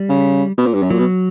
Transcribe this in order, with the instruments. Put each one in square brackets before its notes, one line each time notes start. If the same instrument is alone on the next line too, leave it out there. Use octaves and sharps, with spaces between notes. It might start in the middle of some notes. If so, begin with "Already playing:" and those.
Already playing: [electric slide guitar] G3
[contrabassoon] C#3
B2
A#2
G2
F#2
[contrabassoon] A#2 [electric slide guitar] F#3
[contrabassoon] B2